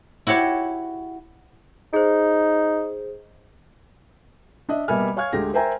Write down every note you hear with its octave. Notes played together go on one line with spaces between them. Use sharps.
E4 F#4 G4 C#5
D#4 G#4 C5
D4 D#5 E5
B2 G3 A#3 E5 G#5 F6
C#5 F5 G#5 C#6 F6 G#6
D2 G#3 G4 A#6
A#4 C5 E5 G5 G#5 A#5